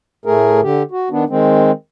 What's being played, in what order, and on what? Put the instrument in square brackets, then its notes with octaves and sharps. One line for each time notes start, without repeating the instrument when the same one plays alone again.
[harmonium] A2 A3 G#4 A#4
D3 G4
F#4
D#3 B3 D4
D#3 G#3 C4